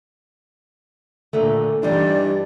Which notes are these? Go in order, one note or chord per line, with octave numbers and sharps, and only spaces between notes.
A#2 D3 A3
G2 E3 G3 D#4 D5